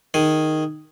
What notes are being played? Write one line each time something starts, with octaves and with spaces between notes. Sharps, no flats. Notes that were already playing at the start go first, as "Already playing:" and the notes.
D#3 G#4